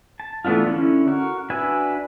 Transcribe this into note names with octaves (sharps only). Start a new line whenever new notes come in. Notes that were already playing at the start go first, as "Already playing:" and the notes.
A5
E3 A3 B3 D4 F4
D3 C#4 E4
F#4 A#4
D4 F#4 B4 E5 G#5